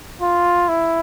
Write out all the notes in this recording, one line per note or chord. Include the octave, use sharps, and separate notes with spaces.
F4
E4